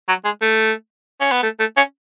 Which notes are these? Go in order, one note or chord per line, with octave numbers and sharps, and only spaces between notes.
F#3
G#3
A3
C#4
B3
A3
A3
C#4